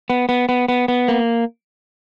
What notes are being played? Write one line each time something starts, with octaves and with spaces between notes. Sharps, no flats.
B3
B3
B3
B3
B3
A#3